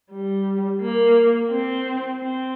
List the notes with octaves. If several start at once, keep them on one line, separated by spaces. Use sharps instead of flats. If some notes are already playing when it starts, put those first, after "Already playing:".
G3
A#3
C4
C4